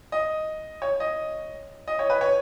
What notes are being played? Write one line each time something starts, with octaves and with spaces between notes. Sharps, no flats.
D#5
C#5
D#5
D#5
C#5
B4
C#5